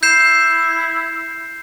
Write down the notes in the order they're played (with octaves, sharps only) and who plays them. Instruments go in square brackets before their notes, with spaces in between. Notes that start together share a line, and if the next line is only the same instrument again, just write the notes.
[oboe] E4 [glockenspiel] G6 C7 E7